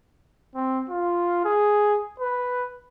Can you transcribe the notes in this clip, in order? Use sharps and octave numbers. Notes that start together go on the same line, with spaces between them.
C4
F4
G#4
B4